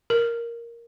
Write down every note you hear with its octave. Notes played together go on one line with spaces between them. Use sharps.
A#4